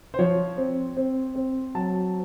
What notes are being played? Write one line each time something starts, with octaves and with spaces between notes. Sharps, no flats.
C5
F3 C#5
C4
C4
C4
F#3 A5